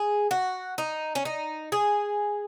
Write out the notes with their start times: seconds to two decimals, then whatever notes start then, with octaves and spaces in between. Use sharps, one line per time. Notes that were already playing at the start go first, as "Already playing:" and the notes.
Already playing: G#4
0.31 F#4
0.78 D#4
1.15 C#4
1.25 D#4
1.72 G#4